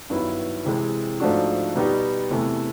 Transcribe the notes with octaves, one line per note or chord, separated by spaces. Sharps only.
G2 D#3 F#3 B3 E4
C3 E3 G#3 C4
G#2 F3 A3 D4 F#4
B2 G3 B3 D#4 G4
E2 C3 E3 A3